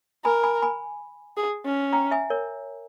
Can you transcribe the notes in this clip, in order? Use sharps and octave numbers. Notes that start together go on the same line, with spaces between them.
A#4 G#5 B5
G#5 B5
G#5 B5
G#4
C#4
G5 A#5
E5 G#5
A#4 C#5